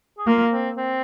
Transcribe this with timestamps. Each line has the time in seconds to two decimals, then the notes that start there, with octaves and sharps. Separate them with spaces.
0.18 G#4
0.27 A#3 F4
0.52 C4
0.77 C4